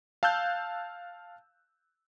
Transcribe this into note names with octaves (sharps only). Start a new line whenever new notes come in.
F5 A5 E6 F#6 G6